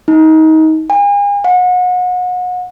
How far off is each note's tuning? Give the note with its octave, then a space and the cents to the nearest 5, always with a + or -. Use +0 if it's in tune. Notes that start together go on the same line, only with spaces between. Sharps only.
D#4 +25
G#5 -40
F#5 -35